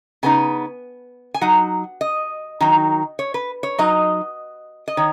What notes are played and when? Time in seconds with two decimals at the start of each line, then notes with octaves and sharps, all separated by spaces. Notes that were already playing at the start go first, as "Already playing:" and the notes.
0.23 C#3 B3 D#4 G#5
1.34 G#5
1.41 F#3 D#4 F#5
2.01 D#5
2.61 D#3 F#3 D#4
3.19 C#5
3.34 B4
3.63 C#5
3.78 F#3 D#4 D#5
4.88 D#5
4.97 D#3 C#5